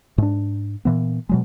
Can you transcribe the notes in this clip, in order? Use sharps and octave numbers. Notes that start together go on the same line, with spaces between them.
G#2 D4
A#2 E3 B3
B2 F#3 G#3